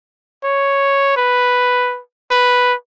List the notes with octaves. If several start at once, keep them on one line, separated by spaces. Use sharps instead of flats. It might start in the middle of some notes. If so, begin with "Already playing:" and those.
C#5
B4
B4